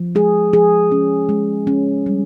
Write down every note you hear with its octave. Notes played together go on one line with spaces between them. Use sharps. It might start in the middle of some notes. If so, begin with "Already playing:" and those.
Already playing: F3
G#3 G#4
F3 G#4
C#4
G#3
C#4
G3